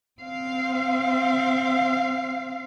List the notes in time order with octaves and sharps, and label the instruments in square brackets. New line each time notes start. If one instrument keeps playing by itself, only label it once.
[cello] C4 F5